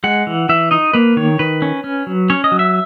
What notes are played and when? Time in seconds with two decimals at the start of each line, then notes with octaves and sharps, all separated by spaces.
0.04 G#3 F#5
0.27 E3
0.49 E3 E5
0.71 D#4 D#5
0.93 A#3 B4
1.17 D#3 C#5
1.39 D#3 B4
1.62 C#4
1.84 C#4
2.07 F#3
2.30 C#4 C#5
2.44 D#5
2.52 F#3
2.59 E5